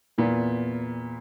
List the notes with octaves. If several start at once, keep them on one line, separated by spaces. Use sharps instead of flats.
E2 A#2 B3